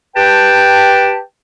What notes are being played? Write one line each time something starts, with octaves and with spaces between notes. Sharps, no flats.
G4 B4 G5 A5